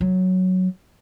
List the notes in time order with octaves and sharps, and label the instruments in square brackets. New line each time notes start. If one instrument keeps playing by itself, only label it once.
[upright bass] F#3